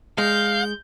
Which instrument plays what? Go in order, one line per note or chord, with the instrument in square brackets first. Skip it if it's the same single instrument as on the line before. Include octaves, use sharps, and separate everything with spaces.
[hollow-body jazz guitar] G#3 [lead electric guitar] F5 [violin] G6